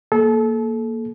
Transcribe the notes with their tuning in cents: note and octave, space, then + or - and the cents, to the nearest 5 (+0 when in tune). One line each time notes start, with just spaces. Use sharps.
A#3 +0 A4 -30